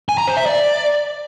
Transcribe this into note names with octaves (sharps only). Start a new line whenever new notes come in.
G#5
A#5
C5
E5
D5